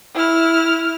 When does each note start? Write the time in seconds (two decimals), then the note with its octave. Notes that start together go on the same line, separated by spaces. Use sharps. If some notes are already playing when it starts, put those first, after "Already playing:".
0.14 E4 F6